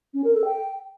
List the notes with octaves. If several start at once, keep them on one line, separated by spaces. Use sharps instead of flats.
C#4
A#4
A4
G5